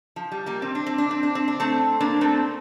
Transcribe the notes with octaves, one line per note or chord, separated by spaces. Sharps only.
F3
G3
G3 A#3
C4
D4
C4
D4
C4
D4
C4
D4
A3 C4
A#3 D4
A3 C4